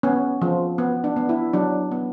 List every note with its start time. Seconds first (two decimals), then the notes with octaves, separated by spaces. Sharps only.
0.03 B3 C#4
0.42 F3
0.78 B3
1.04 D4
1.16 B3
1.29 E4
1.53 F#3 D4
1.92 B3